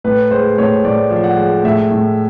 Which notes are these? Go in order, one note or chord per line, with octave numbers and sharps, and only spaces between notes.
A2 B4
G#3 C5
A2 C#5
A2 D5
F3
F#5
G#3
A2 E5
A2